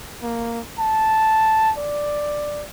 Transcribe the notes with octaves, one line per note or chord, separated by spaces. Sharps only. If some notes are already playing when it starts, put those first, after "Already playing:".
A#3
A5
D5